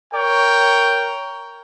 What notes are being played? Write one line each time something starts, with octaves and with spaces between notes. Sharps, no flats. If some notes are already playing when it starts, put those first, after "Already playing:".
A#4 C#5 G5